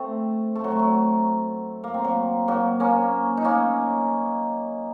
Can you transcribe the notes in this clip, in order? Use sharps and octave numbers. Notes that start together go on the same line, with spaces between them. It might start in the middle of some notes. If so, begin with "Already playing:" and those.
Already playing: A3 C4
A3
F#3
A3
F#3
A#3
C4
F#3 A#3
F#3 A#3
A#3 C#4
D#4
A#3 C#4